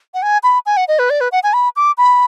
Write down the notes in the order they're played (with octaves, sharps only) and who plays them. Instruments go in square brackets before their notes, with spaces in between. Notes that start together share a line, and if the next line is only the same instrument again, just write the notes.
[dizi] F#5
G#5
B5
G#5
F#5
D#5
B4
D5
B4
F#5
G#5
B5
D6
B5